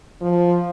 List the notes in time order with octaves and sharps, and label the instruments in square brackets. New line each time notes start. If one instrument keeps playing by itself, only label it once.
[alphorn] F3